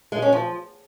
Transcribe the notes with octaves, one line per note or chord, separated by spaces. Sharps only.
G#3
C#4
F3